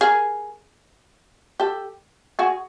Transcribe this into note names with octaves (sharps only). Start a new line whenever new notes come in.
G#4 A#4
G4 A4
F#4 G#4